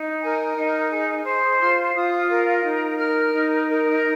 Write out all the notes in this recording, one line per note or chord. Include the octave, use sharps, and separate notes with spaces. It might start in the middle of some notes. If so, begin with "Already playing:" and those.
Already playing: D#4
A#4 G#5
D#4
G#4
C5
F4 C6
F4 D#6
A#4
D#4
A#4 F6
D#4
A#4